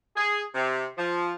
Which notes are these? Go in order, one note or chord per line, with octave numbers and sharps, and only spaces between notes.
G#4
C3
F3